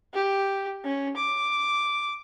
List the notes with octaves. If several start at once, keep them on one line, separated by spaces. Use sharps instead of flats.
G4
C#4
D6